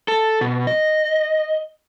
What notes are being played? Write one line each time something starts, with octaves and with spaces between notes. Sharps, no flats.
A4
B2
D#5